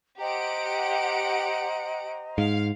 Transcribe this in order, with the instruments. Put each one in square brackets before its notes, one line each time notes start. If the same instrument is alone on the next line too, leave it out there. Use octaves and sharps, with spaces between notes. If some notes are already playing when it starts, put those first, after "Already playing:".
[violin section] G4 F#5 D7 [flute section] C5 D#5 A#5
[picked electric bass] G#2 [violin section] F5